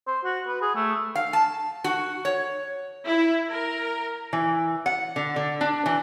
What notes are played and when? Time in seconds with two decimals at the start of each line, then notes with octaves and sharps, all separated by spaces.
0.07 C5
0.24 F#4
0.47 B4
0.62 G#4
0.75 A3
1.16 F5
1.33 A5
1.84 F#4
2.25 C#5
3.06 E4
3.48 A#4
4.33 E3
4.86 F#5
5.16 D3
5.36 D3
5.61 D4
5.86 E3